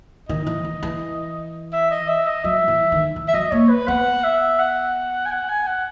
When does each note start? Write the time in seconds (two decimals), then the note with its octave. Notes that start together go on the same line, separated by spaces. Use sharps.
0.29 D#3 D#5
0.47 E3
0.64 D#3
0.83 E3
1.73 E5
1.91 D#5
2.08 E5
2.27 D#5
2.44 F#3 E5
2.68 E3
2.92 D#3
3.16 E3
3.28 E5
3.34 F#3 D#5
3.52 A#3 C#5
3.69 B4
3.88 B3 F#5
4.24 E5
4.59 F#5
5.26 G#5
5.32 F#5
5.49 G#5
5.67 F#5